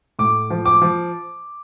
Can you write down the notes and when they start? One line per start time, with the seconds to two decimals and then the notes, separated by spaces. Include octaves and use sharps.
0.19 A2 D6
0.50 F3
0.65 D6
0.82 F3